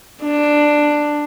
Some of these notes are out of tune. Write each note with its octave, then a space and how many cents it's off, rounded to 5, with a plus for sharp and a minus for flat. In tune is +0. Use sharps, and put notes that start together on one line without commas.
D4 +10